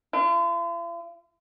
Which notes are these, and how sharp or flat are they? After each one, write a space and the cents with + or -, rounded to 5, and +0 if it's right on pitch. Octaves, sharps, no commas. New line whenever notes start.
F4 -45